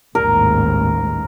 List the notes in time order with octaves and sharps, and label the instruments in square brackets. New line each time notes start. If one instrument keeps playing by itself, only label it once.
[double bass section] A1 D#2 G#2 [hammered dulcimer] A#4